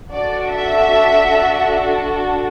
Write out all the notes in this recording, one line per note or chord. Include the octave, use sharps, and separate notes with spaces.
D4 F#4 A4 D5
E5